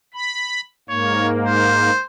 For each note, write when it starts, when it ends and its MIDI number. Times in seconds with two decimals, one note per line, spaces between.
0.14 0.61 83
0.89 1.90 44
0.89 1.90 58
0.89 1.27 73
1.46 2.04 72